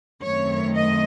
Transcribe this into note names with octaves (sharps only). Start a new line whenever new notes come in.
F#2 D#3 A3 C4 C#5
D#5